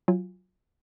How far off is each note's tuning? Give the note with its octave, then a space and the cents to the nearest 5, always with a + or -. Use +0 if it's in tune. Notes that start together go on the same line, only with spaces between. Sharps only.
F#3 +0 F4 +0 G#5 -30